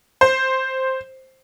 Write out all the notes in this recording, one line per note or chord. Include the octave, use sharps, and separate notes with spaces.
C5